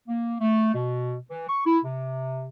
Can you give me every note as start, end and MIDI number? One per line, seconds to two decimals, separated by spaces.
0.08 0.35 58
0.40 0.72 57
0.74 1.15 47
1.29 1.48 52
1.48 1.62 85
1.65 1.78 64
1.84 2.48 48